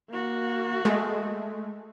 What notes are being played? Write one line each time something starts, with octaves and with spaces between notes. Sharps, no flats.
A#3 F#4
G#3 A3